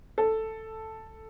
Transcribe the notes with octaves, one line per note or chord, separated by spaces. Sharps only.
A4